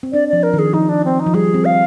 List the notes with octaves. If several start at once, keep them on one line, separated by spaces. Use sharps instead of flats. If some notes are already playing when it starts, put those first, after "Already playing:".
C4
D4 D5
F3 D5
A#4
D#3
G#4
F3 D#4
D4
C4
D#4
F3
G3 G#4
C4
F5